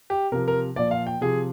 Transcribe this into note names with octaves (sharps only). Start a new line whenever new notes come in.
G4
C3 F3 A#4
A#4
A#2 F3 D5
F5
G5
C3 F3 G#4